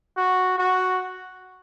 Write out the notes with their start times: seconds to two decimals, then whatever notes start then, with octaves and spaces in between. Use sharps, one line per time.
0.17 F#4
0.58 F#4